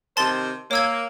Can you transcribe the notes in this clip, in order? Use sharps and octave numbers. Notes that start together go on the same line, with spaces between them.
C3 D#3 C5 A5 C6 A6
A#3 C#5 E6 G#6